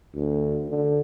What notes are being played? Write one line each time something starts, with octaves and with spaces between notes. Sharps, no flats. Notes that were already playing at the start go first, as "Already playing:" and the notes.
D2
D3